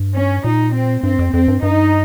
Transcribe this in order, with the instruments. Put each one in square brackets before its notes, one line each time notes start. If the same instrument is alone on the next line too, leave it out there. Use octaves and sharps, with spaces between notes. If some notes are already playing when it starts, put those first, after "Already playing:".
Already playing: [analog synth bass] G2
[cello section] C#4
[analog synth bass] A#2 [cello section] D#4
[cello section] C4
[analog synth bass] G2 [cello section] C4
[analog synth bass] F2
[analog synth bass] F2 [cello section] C4
[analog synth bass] G2
[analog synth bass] G2 [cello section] D#4